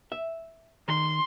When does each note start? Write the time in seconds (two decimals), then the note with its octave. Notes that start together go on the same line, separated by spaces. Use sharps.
0.12 E5
0.88 D#3 C6